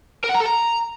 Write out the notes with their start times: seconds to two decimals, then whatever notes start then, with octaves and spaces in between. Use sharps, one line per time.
0.24 A#4
0.30 F#5
0.35 A#5
0.40 A4
0.46 A#5